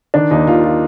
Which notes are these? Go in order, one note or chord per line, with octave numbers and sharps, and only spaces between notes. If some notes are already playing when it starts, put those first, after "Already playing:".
D#3 D4
D#2 D#4
D#2 F4
F4